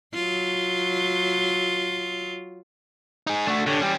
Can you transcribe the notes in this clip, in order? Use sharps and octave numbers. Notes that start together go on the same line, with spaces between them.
F#3 F4
D#4 G#4
A3 D4 F#4
D3 D4 G4 C#5
G3 C#4 G4